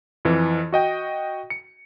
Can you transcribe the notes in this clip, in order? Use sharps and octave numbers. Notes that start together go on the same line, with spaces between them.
F2 E3
F#4 D#5 G5
C#7